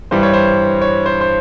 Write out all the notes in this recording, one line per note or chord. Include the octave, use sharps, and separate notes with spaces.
G2 E3 G3 C5
C#5
C5
C#5
C5
C5